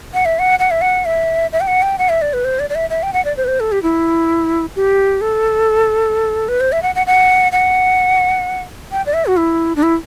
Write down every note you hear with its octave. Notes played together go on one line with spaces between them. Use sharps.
F#5
E5
F#5
F#5
E5
F#5
E5
E5
G5
F#5
G5
F#5
E5
D5
B4
C5
D5
D5
E5
E5
G5
F#5
D5
C5
B4
C5
A4
G4
E4
G4
A4
B4
C5
E5
F#5
F#5
F#5
F#5
G5
D5
E5
F#4
E4
D4
E4